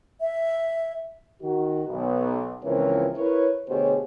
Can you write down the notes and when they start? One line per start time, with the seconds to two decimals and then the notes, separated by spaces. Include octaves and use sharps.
0.21 E5
1.42 D#3 F#4
1.88 B1
2.64 C#2 E3 F3 C4 A#4 C#5
3.17 E4 A#4 B4 C#5
3.69 D2 B2 G4 G#4 C5 C#5